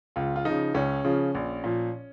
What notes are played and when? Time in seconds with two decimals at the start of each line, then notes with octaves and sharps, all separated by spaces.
0.16 C#2 F4
0.36 F4
0.45 F3 D#4
0.50 C#3
0.74 C#2 C#4
1.04 C#3 F3
1.35 A#1
1.64 A#2 F3